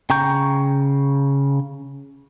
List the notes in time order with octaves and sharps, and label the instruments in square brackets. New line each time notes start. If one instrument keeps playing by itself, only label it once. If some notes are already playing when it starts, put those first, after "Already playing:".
[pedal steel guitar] C#3 G5 A#5 C#6 G6